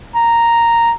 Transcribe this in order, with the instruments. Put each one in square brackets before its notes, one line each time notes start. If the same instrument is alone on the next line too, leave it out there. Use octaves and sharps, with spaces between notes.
[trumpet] A#5